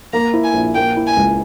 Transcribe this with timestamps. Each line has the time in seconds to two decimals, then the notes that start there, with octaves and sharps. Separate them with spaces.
0.13 A#3 A#5
0.34 E4
0.44 G#5
0.54 A#1
0.75 A#3 G5
0.97 E4
1.07 G#5
1.16 C#2